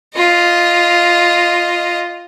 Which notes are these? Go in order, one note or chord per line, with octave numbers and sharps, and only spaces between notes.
F4 D#5